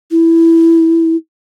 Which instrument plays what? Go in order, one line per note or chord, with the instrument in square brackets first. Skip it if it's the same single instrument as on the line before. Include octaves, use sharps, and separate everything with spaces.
[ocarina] E4